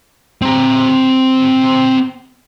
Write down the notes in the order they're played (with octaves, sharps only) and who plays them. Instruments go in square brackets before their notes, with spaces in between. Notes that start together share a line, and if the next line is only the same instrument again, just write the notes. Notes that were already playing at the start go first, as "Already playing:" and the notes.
[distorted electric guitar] C4 A#5